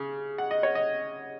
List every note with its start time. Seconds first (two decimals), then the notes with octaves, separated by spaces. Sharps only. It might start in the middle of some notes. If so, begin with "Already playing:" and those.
Already playing: C#3
0.38 F#5
0.51 D#5
0.63 C#5
0.75 D#5